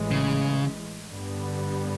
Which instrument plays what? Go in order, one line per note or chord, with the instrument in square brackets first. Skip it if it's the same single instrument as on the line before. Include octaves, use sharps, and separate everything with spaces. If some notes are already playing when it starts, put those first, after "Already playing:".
Already playing: [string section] A1 A2 E3 G#3
[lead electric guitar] C#3
[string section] G2 D3 G3 B3